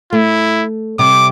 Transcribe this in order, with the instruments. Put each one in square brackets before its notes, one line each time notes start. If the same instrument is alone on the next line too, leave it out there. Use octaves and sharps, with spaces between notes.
[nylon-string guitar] A3 [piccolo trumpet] E4
[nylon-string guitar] C3 G3 [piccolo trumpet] D6